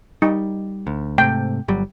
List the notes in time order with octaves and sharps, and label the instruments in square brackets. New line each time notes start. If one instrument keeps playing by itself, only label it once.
[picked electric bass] G3 [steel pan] D#4
[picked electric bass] D2
[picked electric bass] G#2 C3 A3 [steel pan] G5
[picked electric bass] G1 F#3 G3